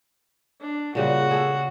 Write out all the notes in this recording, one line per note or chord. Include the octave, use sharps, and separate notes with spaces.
D4
A#2 C#3 G3 F#4
G#4 A4